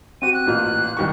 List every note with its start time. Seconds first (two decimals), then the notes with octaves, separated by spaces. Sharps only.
0.22 C4 F#4 G4 D#7
0.34 F#6
0.46 A1 A#2 F6
0.97 C2 D#3 C#6